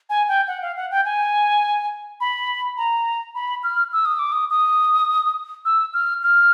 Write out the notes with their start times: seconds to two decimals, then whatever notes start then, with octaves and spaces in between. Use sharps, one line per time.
0.10 G#5
0.28 G5
0.48 F#5
0.62 F5
0.76 F#5
0.91 G5
1.05 G#5
2.20 B5
2.77 A#5
3.35 B5
3.64 F6
3.93 E6
4.05 D#6
4.19 D6
4.32 D#6
4.50 D#6
5.65 E6
5.94 F6
6.23 F6